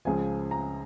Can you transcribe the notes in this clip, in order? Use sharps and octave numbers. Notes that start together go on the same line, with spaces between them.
C#2 C#3 F3 G#5
A#5